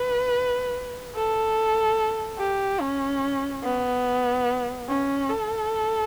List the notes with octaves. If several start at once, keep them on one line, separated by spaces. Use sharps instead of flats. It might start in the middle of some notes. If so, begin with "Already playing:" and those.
Already playing: B4
A4
G4
C#4
B3
C#4
A4